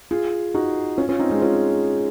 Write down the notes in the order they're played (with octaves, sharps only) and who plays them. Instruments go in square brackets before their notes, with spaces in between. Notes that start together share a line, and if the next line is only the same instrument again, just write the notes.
[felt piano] F4 G#4
D#4 F#4
C#4 F4
C#4 F4
C4 D#4
G#3 C4
C#4 F4